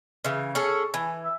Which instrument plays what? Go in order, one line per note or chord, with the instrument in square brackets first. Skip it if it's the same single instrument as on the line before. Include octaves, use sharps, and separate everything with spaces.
[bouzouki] C#3 E3
[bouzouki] C#4 G#4 A4 [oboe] C#6
[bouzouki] E3 [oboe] G#5
[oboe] E5